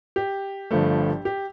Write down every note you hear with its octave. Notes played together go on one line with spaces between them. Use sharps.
G4
G1 G2 F3 A3
G4